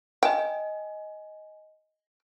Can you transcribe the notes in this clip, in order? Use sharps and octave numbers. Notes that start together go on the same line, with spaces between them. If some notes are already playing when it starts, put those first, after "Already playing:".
D#5 G5 G#5